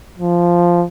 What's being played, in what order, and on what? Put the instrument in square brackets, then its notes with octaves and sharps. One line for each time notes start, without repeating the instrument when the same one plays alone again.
[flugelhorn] F3